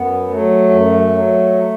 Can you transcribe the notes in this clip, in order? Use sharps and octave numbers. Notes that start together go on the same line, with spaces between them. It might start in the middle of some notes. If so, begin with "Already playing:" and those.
Already playing: F#2 B3
F#3 A3
F#2
F#3